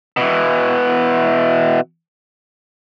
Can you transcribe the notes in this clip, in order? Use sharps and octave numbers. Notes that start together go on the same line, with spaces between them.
B2 E3